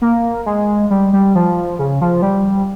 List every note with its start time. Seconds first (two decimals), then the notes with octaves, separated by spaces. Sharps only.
0.02 A#3
0.46 G#3
0.90 G3
1.13 G3
1.35 F3
1.79 C#3
2.01 F3
2.22 G3